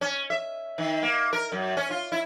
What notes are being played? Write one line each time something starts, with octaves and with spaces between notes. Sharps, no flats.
C#4
E5
D#3
A#3
A#4
F#2
C#4
F4
E4